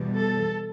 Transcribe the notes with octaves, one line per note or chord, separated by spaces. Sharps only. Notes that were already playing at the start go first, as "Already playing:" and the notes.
Already playing: E2 B2 G3
A4